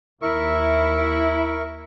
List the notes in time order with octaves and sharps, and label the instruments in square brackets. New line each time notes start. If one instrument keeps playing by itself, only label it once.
[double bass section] D#2 [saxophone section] E4 [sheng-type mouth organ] A#4 E5 C#6